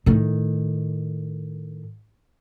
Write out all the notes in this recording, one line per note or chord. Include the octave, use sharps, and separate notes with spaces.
A2 D#3